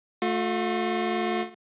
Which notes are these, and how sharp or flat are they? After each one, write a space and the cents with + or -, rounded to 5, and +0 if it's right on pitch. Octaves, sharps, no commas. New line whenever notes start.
A3 +0 F4 +45